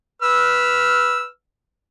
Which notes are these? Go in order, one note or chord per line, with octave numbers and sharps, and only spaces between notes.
B4 E6 F6